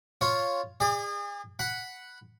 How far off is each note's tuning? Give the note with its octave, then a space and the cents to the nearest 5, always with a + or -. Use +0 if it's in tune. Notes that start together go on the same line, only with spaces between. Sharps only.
F4 +0 C#5 +0
G#4 -35 D5 +35
F#5 +0 B5 +0